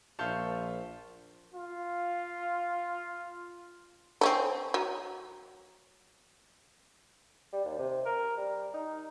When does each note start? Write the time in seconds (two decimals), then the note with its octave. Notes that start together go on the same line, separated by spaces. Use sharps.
0.19 A#1 F4 E5 F5 A5 C#6 G6
1.55 F4 F5
4.21 C4 C#4 A4
4.74 F#3
7.53 G3
7.65 D#2
7.79 C3
8.05 A#4
8.37 G3
8.73 D#4